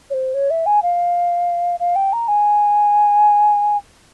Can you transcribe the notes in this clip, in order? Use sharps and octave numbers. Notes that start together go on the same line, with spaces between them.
C#5
C5
C#5
E5
G#5
F5
F5
G5
A#5
G#5